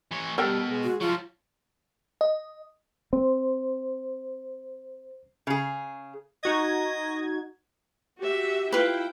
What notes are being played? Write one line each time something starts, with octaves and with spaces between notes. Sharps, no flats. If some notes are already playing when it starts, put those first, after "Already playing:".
E3 C#5
B2 G3 A4 A#4 G5
G#3
F#4
F3 F#3 F4
D#5
C4 C5
C#3 G#4
D#4 F#4 D#5 G#6
F#4 G4 E5
E4 F4 B4 G5